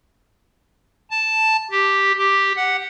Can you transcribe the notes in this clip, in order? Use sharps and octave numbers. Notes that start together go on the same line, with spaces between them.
A5
G4
G4
F#5